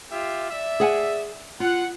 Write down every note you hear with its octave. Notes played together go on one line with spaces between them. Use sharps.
F4 G4 E5
D5 E5
G#4 F#5 G#5
F4 F#5